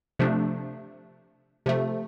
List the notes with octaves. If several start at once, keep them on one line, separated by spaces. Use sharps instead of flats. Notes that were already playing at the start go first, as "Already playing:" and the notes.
C3 F3 A3 D4
C3 F3 A3